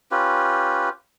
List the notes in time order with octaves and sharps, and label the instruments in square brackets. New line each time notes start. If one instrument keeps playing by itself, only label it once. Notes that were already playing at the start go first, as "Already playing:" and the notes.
[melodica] C#4 F4 G4 B4